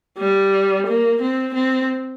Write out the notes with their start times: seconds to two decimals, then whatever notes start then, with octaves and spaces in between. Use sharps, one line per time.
0.19 G3
0.87 A#3
1.22 C4
1.54 C4